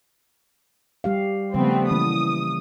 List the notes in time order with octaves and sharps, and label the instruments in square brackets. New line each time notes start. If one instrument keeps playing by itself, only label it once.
[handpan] G3 G4 F5
[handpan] C#3 F3 G3 [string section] A3 B3 C4
[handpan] E3 A#3 C#4 [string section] D#6